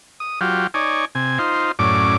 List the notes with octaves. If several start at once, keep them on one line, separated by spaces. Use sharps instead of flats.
D#6
F#3 F4 G4
D#4 C#5 D5 G#5
C3 G#5
D#4 F4 C5
F#2 A2 C#4 D5 D6